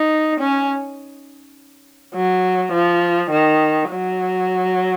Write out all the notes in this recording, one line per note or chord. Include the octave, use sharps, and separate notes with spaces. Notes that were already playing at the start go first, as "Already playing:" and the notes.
Already playing: D#4
C#4
F#3
F3
D#3
F#3